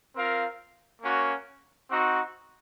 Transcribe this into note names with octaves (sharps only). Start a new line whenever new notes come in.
C4 F4 A#4 F5
A#3 C#4 F#4
C4 D#4 F#4